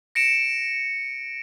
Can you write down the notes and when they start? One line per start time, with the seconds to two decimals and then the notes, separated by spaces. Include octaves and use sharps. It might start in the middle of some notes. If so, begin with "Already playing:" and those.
0.15 A#6 C#7 D7 E7